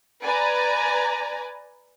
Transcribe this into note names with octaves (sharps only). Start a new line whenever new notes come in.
B4 D5 G#5 A#5